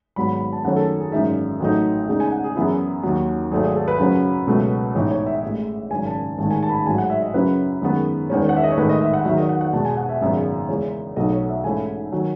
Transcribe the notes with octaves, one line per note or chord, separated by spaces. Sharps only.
G#1 G#2 F#3 B3 B5
B5
B5
A5
F#2 D#3 F#3 A3 C#4 F#5
A4
G#4
G#1 F#2 E3 G#3 D#4 E5
A1 A2 F#3 A3 D#4
E2 C#3 G#3 D#4
G#5
F#5
G#4
F#2 E3 B3 E4 G#4
D#2 D#3 F#3
G#1 G#2 F#3 A3 G#4
G#4
A4
B4
F#2 C#3 F#3 C#4
C#2 B2 F#3 A3
A1 G#2 E3 B3 D#4 C#5
C#5
E5
A1 A2 G#3
G#1 F#2 C#3 G#5
A5
A1 G#2 D#3 G#3 A5
G#5
A5
B5
A5
A1 G#2 F#3 G#5
F#5
E5
D#5
F#2 C#3 F#3 C#4 E4 B4
F#2 D#3 G#3 B3
E1 E2 D#3 G#3 C#4
F#5
E5
D#5
C#5
A1 G#2 D#3 A3 B4
D#5
E5
F#5
E2 D#3 F#3 E5
D#5
F#5
F#5
E2 B2 G#3 B3 A5
G#5
F#5
E5
G#1 F#2 C#3 G#3 B3 E5
E2 C#3 E3 G#3 C#4
B1 B2 F#3 A3 D#5
C#5
E5
G#2 E3 A3 C#4 E4 G#5
D#3 F#3